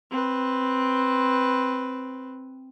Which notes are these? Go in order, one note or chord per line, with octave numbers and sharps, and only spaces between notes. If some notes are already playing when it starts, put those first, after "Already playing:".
C4 B4